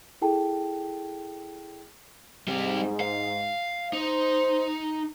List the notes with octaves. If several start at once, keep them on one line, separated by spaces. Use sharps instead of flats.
E4 G#4 A4 G5 A5
G#2 G3 C4
F5
D#4 C5